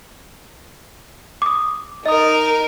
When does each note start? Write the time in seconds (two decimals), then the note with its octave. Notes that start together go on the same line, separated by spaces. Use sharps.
1.42 D6 D#6
2.06 D#4 A#4 D#5 D#6